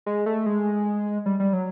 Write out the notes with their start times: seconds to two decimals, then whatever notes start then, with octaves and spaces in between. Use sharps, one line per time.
0.06 G#3
0.26 A3
0.46 G#3
1.26 G3
1.40 G3
1.53 F#3